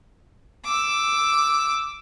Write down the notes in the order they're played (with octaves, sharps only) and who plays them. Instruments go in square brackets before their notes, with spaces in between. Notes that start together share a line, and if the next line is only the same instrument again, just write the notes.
[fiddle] D6 E6